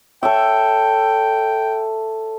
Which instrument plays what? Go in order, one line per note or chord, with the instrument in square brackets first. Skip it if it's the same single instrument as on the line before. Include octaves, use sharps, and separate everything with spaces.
[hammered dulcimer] A4 C#5 E5 [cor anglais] G5